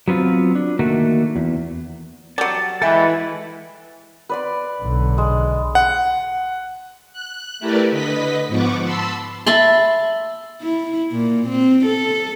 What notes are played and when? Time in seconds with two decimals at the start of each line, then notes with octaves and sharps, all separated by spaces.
0.08 F#3 B3 C4 F4
0.55 D4
0.79 D3 D#3 A3 A#3 F#4
1.36 E2
2.38 F#3 G3 A5
2.82 E3 G#3 A4 E5 G5 G#5
4.29 B4 D5 C6
4.82 B1 D3
5.18 G#3
5.75 F#5
7.13 F#6
7.60 A3 E4 G4 A#4 B4 D5
7.91 D3 B4 D#5 B6
8.48 G#2 F3 B3 F#5 C#6 D6
8.83 A5 B5 C6 E6
9.47 E5 A5 B5 C6
10.62 E4
11.12 A#2
11.48 C4
11.85 A4